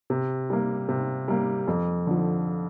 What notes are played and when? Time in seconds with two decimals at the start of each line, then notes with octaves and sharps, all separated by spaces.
0.10 C3
0.50 G3 A#3
0.88 C3
1.28 G3 A#3
1.67 F2
2.07 D3 F3